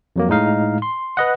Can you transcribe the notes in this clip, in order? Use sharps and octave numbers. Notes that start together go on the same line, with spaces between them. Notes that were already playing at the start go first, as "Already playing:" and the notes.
F2 F#3 A#3
A2 G#3 D#4 F5
C6
B4 D#5 F#5